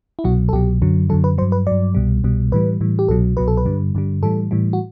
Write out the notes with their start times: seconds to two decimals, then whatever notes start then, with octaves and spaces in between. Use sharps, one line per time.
0.19 E4
0.24 C2 B2 F#3 F#4
0.49 A4
0.52 C2 B2 F#3 G4
0.82 F#2 D3 F#3
1.09 F#2 D3 F#3 A4
1.24 B4
1.38 F#3 C5
1.42 G2
1.52 B4
1.67 G2 F#3 D5
1.95 C2 B2 G3
2.24 C2 B2 G3
2.52 A2 E3 G3 B4
2.81 A2 E3 G3
2.99 G4
3.08 C2 B2 F#3 A4
3.37 C2 B2 F#3 B4
3.48 A4
3.57 B4
3.65 G2 D3 G3
3.95 G2 D3 G3
4.23 A2 E3 G3 A4
4.51 A2 E3 G3
4.73 F#4